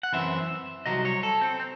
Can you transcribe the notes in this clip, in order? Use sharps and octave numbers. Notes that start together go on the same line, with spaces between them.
F#5
F#2 E3 C4 E5
C2 C3 D#3 F#3 D#5
C#5
A4
C4
C4